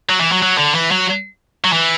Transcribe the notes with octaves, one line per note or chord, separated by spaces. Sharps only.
F#3
E3
F#3
F#3
D3
E3
F#3
F#3
E3